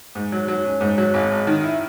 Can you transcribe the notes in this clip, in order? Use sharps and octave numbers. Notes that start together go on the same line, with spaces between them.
G#2
F#3
F#3
C#4
G#2
F#3
G#1
G#1
D#3
E4